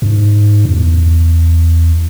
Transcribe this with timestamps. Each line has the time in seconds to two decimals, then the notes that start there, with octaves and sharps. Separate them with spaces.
0.02 F2
0.06 G#2
0.65 F2
0.71 E2